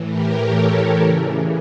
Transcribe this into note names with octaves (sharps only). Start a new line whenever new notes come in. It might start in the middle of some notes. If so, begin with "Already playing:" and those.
Already playing: A2 E3
G4 A#4
A4 C#5
C#3 E3 A#4 D5